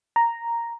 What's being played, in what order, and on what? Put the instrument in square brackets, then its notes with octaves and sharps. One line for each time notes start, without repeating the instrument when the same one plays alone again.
[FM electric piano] A#5